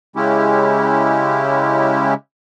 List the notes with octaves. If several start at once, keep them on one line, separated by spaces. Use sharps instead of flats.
C#3 G#3 C#4 E4 G4